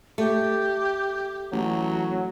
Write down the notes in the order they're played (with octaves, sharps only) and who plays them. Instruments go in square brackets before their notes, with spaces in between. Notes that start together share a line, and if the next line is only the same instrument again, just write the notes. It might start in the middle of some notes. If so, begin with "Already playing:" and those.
[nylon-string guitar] A3 [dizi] G4
[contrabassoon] A1 [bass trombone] F#3